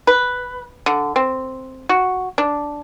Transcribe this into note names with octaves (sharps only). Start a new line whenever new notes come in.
B4
D3
C4
F#4
D4